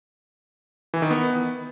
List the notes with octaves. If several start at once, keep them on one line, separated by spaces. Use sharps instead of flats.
E3
D#3
B3